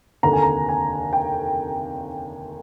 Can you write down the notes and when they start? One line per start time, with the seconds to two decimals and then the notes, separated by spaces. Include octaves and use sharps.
0.23 F1 D#2 D3 A#5
0.33 G#5
0.43 A#5
0.69 G#5
1.13 G5